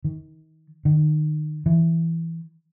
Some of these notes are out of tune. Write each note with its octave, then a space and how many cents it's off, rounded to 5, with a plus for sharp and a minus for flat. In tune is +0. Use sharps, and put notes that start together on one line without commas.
D#3 +30
D#3 -30
E3 +5